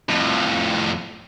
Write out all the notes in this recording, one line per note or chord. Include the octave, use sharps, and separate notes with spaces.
F2 A2